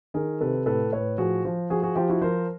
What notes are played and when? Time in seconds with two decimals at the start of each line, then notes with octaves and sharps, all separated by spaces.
0.14 D#3 G#4 A#4
0.41 C3 A4 B4
0.66 A2 A4 B4
0.92 A2 B4 C#5
1.18 F3 F#4 G#4
1.45 F3
1.70 F3 F#4 G#4
1.83 F#4 G#4
1.95 F3 F4 G4
2.09 E4 F#4
2.21 F3 A#4 C5